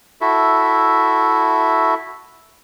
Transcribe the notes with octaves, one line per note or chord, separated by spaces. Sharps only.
E4 F#4 A4 E5